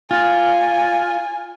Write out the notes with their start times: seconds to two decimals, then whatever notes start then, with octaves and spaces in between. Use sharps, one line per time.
0.11 F4 G#5